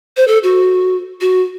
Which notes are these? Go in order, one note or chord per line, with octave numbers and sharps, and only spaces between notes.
C5
A4
F#4
F#4